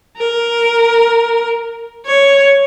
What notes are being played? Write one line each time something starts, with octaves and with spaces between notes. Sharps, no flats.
A#4
C#5